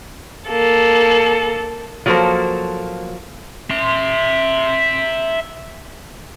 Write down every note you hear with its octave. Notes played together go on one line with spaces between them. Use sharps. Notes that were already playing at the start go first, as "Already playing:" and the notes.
A#3 A4
F3 F#3 A#3 A4 C5
E5 C6